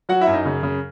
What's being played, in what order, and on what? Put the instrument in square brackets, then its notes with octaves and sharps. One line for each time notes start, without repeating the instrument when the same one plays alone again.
[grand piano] F#3 F#4 F#5
E4 E5
F#2
D#4 D#5
C#3
C#3